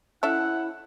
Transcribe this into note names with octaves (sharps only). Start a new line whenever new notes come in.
C#4 E4 A4 E5 F#5